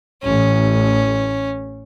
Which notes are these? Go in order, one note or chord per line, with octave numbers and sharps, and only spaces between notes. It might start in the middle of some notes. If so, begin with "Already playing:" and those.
A1 C#4